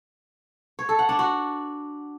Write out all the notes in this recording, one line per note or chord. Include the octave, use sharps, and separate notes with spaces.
C#5
A4
F#5
D4
F#4